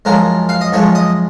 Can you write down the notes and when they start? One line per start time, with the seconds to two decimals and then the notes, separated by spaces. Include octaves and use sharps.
0.05 F#2 F3 G#3 A#4
0.49 F5
0.61 D#5
0.72 F#2 F3 G#3 C#5
0.95 D#5